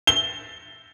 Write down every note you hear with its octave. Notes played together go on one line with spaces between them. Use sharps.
G7